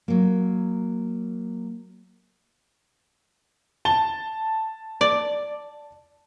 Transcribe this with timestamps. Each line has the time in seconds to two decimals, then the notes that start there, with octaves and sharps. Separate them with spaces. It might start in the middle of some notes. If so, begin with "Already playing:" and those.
0.08 F#3 A#3
3.85 A5 G7
5.01 D5